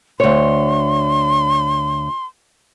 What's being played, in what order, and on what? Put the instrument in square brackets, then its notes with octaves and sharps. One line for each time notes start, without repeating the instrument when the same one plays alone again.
[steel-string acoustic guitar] D2 C#5 [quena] C6